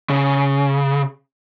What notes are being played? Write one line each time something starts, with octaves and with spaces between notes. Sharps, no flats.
C#3